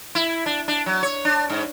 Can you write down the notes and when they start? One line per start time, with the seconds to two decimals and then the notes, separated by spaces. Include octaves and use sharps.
0.15 E4
0.46 D4
0.68 D4
0.86 F#3
1.03 C#5
1.25 D4
1.50 G#2